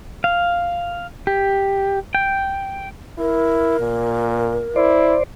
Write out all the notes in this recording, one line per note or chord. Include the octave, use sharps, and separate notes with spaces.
F5
G4
G5
E4 A#4
A#2
E4 C5 D5